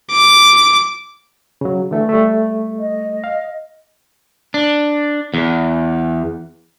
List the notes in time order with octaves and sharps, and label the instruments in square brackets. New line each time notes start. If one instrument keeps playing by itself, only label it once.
[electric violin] D6
[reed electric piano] C#3 F#3
D3 E3 A3
G3 A3
[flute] D#5
[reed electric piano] F5
[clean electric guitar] D4
E2